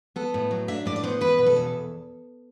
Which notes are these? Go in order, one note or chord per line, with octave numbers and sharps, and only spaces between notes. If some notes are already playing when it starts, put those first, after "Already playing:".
B3 A4
A2
F#3
D4 E5
A2 D5
D5
B3 C5
E2 B4
B2
A4
E2